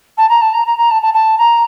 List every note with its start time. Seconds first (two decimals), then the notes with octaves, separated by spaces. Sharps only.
0.18 A5
0.29 A#5
0.41 A5
0.53 A#5
0.66 A#5
0.77 A#5
0.90 A5
1.02 A5
1.14 A5
1.38 A#5